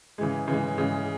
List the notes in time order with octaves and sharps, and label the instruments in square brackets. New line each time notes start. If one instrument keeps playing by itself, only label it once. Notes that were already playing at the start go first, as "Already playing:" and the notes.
[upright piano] C#3 E3 G#3
C#3 E3 G#3
C#3 E3 G#3